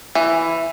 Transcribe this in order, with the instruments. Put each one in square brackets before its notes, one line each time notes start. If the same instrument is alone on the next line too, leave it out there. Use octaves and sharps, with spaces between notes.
[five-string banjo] E3